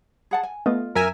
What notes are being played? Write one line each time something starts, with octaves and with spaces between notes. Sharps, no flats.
G#4 F#5 A5
G#5
A3 B3 F4 D#5
F#2 A#4 E5 G#5 E7